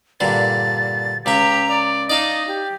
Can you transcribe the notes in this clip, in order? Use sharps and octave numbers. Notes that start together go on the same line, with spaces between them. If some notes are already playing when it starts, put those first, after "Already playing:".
G2 A#2 D3 A6
C#2 C#3 G4 E5 A#5
D5
D#4 D5 D#5 F5 A5
G4